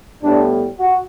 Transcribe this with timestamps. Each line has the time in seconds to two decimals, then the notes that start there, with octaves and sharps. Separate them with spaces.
0.22 A2 G3 B3 D4
0.78 F#4